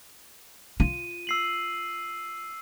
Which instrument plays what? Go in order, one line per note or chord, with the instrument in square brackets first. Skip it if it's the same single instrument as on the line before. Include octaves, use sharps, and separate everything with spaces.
[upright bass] F4 [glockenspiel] D#7
[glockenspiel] E6 C7 F#7